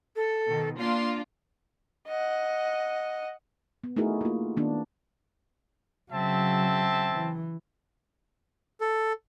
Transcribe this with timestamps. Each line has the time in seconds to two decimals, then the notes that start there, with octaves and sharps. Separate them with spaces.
0.15 A4
0.46 B2 D#3
0.78 A#3 D4 F4 C6
2.07 D#5 F#5
3.84 B3
3.96 A3 D#4 E4 F#4 G#4 A#4
4.21 A#3 F4
4.57 D#3 A#3 B3 D4
6.11 C#3 F#3 C4 E5 A5
7.12 E3
8.81 A4